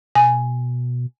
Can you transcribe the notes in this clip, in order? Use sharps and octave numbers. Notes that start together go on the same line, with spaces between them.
B2 G#5